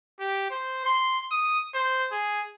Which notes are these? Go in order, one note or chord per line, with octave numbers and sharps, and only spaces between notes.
G4
C5
C6
D#6
C5
G#4